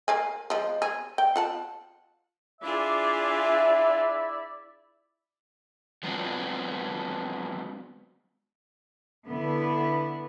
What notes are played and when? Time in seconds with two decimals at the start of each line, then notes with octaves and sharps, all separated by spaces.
0.08 A#4 F5 G#5
0.50 F3 G#3
0.82 G#4
1.18 G5
1.36 F4 F#5 A5
2.61 D4 E4 F4 G#4 D5 E5
6.03 F#3 G#3 B3 C4 D4 F4
9.26 D3 B3 E4